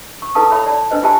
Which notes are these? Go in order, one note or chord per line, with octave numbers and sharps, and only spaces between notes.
C#6
E4 A4 B4 F5 A5 D#6
A4 C#5 E5 B5
D5 A5 B5
D4 B4 C5 D#5
F4 G4 E5 G#5 A5